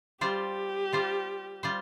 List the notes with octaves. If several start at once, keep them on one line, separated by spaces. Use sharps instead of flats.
G3 F4 G4 C5
G3 F4 C5
G3 F4 C5